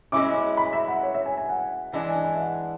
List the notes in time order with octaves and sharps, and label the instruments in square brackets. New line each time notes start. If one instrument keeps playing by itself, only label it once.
[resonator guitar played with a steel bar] B2 G#3 C#4 E4 [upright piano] D6
[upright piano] B5
E5
F#5
C#5
E5
G#5
G#5
F#5
[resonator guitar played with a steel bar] E3 G#3 D4 [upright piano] G#5
[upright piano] G#5
G#5
E5
F#5